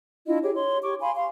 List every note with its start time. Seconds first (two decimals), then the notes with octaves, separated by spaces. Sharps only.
0.27 D4 E4 F4 D#5
0.42 G4 G#4 C#5
0.55 C#5 C6
0.82 G4 C#5 C#6 D6
1.01 F5 G#5 B5 C6
1.15 F5 C6